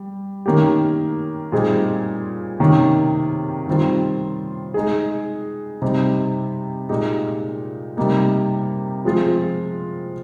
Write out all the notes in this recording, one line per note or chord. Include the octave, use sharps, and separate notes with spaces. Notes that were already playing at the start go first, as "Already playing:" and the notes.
Already playing: G3
D#3 A#3 C#4 G4
A#2 G3 C4 D#4 G#4
C3 D#3 A#3 C#4
D#3 G3 C4 F4
G#3 D#4 G#4
C3 G3 C4 D#4
A#2 G#3 D#4 G4
C3 G3 A#3 D#4
F3 G#3 C4 F4